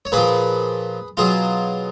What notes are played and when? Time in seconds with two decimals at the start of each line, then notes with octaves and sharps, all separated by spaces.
0.05 C#5
0.12 A#2 F3 G#4 B4
1.17 B2 F#3 F4 G#4